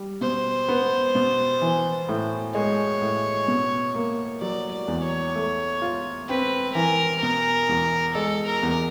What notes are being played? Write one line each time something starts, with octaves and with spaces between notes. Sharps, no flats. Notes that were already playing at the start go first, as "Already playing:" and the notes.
Already playing: G3
B2 C5
B3
B2
E3
A2
G#3 C#5
A2
B2
A#3
F#3 D5
D5
E2
C#5
A3
F4
C4 B4
E3 A#4
B2 A#4
E2
G#3 A4
A#4
E2